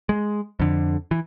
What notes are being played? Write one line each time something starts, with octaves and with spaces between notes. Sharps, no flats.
G#3
F2 D3
E3